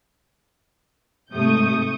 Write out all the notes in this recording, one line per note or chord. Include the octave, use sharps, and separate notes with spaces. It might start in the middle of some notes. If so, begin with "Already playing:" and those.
G#2 C3 A3 C#6 D#6 G6